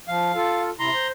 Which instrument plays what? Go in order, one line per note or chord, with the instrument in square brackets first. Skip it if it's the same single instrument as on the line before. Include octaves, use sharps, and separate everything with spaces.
[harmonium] F3 [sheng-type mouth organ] F5
[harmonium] F4 A4
[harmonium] C3 E4 [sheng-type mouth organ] A#5 C6
[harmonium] C5